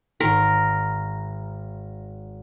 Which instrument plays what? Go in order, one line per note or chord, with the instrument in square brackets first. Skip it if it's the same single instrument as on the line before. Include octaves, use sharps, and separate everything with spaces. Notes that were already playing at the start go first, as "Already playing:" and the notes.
[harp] G#1 C6 [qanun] A#4